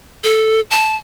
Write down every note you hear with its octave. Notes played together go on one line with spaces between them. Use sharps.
A4
A5